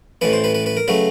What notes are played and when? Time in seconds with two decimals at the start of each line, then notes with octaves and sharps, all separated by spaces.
0.21 A1 A2 E3 B4
0.33 C5
0.44 B4
0.54 B4
0.66 B4
0.77 A#4
0.88 C#3 F#3 A3 B4